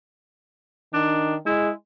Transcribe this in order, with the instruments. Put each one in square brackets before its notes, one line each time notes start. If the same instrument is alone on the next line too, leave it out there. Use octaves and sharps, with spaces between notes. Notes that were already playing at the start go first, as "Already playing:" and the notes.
[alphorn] D#3 [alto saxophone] D4
[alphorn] G#3 [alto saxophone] E4